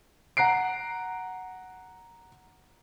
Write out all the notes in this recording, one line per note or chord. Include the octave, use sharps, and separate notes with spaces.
F#5 A#5 F#6 C7 D7